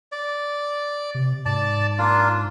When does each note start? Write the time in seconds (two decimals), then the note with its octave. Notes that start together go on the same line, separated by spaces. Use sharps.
0.12 D5
1.15 C3
1.46 G#2 D5 A5
1.99 A#3 D4 F4